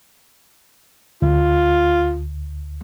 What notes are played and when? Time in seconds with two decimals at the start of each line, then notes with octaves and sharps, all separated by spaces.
1.22 D2 F4